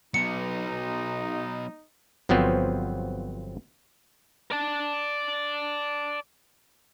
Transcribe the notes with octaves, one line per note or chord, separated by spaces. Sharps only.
F#3 B3 D#4 C#7
G1 F3 F#3 B3 C4
D5 A5